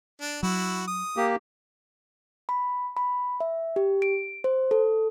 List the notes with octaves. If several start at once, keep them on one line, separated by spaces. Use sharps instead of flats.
D4
F#3 E4 F#4
D#6
A#3 G4
B5
B5
E5
G4
D7
C5
A4